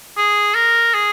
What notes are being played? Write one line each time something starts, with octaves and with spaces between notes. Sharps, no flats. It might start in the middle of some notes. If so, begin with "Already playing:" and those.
G#4
A#4
G#4